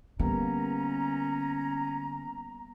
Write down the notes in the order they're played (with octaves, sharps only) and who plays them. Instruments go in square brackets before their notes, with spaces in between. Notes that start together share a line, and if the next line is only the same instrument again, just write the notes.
[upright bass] D3 [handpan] G3 A#3 B3 [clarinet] C#4 [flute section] A#5